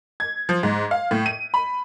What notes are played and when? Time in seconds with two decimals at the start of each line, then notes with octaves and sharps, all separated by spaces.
0.20 G#6
0.49 F3
0.63 G#2
0.91 F5
1.11 A2
1.26 D#7
1.54 B5